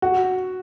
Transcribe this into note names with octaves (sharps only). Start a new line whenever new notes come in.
F#4